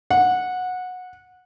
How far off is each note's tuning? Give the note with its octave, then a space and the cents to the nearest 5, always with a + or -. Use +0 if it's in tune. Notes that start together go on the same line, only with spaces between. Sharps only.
F#5 -15